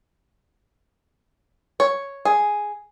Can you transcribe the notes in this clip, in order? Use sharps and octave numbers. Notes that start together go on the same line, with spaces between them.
C#5
G#4